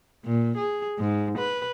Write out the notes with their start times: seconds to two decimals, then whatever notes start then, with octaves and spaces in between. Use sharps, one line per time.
0.25 A#2
0.57 G#4
0.99 G#2
1.38 B4